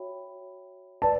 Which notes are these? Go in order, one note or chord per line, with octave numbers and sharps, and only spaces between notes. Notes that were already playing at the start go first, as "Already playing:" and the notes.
Already playing: F#4 C#5 E5 G5 B5
B4 D5 A5